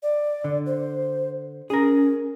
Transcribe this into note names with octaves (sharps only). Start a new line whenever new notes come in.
D5
D3
C5
C#4 G#4 A#4